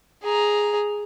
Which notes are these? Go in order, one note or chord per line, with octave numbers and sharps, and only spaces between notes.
G#4 A#5